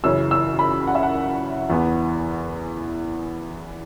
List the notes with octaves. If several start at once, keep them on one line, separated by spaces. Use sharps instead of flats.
F#2 C#3 E3 C#4 E6
E6
B5
F#5
E5
F#5
E2 E3 B3